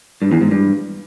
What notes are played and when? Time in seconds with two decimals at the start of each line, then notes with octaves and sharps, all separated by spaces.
0.22 G2
0.32 E2
0.41 G#2
0.51 G2